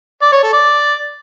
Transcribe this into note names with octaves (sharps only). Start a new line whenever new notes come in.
D5
C#5
A4
D5